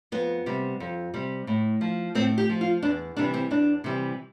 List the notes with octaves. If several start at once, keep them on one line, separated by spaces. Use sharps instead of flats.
F2 B3
C3 G3
F2
C3 G3
A2
F3
A2 C4
G4
F3
F4
E2 D4
C3 E3 G3 D4
C4
E2 D4
C3 E3 G3